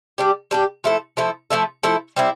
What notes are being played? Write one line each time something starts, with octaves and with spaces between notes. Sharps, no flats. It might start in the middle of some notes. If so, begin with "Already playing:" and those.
G3 D4 G4
G3 D4 G4
F3 A3 E4 A4
F3 A3 E4 A4
F3 A3 E4 A4
F3 A3 E4 A4
G3 C4 E4